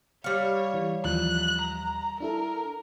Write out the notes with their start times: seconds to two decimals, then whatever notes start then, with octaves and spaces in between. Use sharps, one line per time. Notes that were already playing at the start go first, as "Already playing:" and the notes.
0.24 G3 C#5 F5 D6 C#7
0.74 E3
1.05 D#2 E3 F3 F#6
1.61 A#5
2.20 D4 E4 A4 A#4